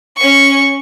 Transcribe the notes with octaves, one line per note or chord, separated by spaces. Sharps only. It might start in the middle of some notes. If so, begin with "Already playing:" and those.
C#4 C#6